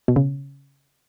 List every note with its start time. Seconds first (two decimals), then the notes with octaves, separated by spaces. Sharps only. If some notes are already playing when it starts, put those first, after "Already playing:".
0.08 B2
0.16 C#3